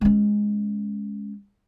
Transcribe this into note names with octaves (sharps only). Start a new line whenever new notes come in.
G#3 C#4